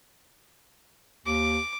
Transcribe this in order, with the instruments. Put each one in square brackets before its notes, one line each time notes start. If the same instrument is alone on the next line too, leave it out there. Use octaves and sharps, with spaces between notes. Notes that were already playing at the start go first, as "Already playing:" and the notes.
[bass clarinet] D#2 [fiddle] D6